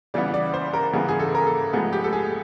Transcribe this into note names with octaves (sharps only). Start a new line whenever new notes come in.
C#3 E3 G3 B3 D5
D5
C5
A#4
C#3 E3 G3 B3 G#4
G#4
A4
A#4
A4
A2 F3 G#3 B3 G#4
G4
A4
G#4